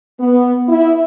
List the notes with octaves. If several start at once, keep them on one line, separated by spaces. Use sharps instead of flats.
B3
E4